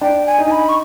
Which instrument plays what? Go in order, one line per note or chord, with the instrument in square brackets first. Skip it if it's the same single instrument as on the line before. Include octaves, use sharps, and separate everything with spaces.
[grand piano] D4 [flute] G5
[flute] G#5
[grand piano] D#4
[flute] B5
C#6